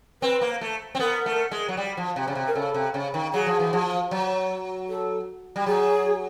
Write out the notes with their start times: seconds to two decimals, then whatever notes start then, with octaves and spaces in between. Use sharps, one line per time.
0.22 C4 B4
0.41 A#3
0.61 A3
0.95 C4
0.99 B3 A#4
1.26 A3
1.51 G#3
1.68 F#3
1.77 G3
1.97 F3
2.16 C3
2.28 C#3
2.35 C3
2.47 A#4
2.55 C#3 A4
2.74 C3
2.94 C#3
3.14 D#3
3.34 F#3 G#4
3.46 F3
3.60 E3
3.73 F3
4.11 F#3
4.89 A4
5.56 G3
5.66 F#3 G#4